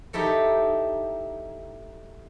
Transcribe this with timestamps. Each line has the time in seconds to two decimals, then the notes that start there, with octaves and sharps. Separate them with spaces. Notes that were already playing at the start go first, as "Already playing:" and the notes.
0.13 D#4 E4 G4 A4 C#5